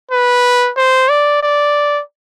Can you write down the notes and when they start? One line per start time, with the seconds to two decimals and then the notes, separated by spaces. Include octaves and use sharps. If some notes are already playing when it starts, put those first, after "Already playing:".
0.11 B4
0.77 C5
1.10 D5
1.43 D5